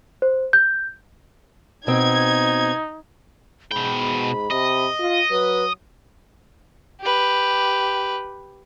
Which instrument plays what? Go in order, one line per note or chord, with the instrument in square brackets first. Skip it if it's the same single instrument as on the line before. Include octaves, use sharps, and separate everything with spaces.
[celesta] C5
G6
[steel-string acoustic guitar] B2 C4 [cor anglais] D#4 [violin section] G#6
[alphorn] G#2 [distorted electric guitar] B2 G5 [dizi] B5
[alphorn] C3 [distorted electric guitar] D#5
[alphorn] F4
[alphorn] F#3 [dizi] B4
[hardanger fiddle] G4 B4